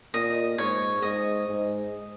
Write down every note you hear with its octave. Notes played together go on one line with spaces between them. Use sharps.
A#2 D#5
G#2 C#5
G#2 D#5
G#2